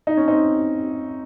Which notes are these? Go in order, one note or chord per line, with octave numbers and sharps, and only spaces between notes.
D#4
C#4
C4 D#4